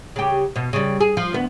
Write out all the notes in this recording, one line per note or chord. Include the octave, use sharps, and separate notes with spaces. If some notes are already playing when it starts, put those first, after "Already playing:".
C#3 G4
B2
C#3 G3
G#4
F3
D2 B3